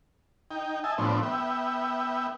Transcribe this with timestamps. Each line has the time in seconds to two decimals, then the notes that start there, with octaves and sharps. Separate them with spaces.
0.51 D#4 G5
0.84 D#5 E5 G#5 A5
0.98 A2 F3 B3 C4 D4
1.23 B3 E5 G5